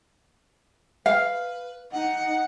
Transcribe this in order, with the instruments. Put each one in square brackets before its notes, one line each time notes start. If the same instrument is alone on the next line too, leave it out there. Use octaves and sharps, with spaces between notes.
[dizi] B4 [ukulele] F5
[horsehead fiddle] D#4 [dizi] F#5